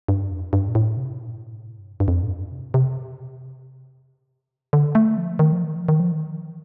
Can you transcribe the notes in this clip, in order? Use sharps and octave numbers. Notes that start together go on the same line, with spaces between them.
G2
F2
G2
A#2
A2
C3
A#2
A2
G2
G2
F2
A2
G2
C3
C3
D3
A3
F3
D#3
F3
D#3
F3
D#3
F3
D#3